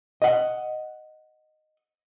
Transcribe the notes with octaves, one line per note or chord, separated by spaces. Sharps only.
D#5 F#5